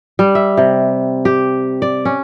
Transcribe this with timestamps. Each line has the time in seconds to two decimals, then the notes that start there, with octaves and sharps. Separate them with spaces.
0.19 G3
0.35 E5
0.57 C3
1.25 G4
1.82 D5
2.05 C#4